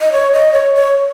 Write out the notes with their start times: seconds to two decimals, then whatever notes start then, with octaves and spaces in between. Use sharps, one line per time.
0.01 D#5
0.13 C#5
0.33 D#5
0.53 C#5
0.75 C#5